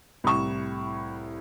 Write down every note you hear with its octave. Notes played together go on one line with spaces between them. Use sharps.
C2 A2 C#6 E7